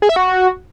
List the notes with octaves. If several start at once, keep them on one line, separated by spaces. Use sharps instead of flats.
G#4
E5
F#4